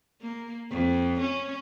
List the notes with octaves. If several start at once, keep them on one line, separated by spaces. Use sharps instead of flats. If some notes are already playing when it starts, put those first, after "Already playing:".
A#3
F2
C#4